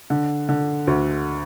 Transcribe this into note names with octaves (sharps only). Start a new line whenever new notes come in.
D3
D3
D2